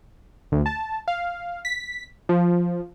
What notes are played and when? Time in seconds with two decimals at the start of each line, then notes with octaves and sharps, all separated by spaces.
0.52 D2
0.66 A5
1.08 F5
1.65 B6
2.29 F3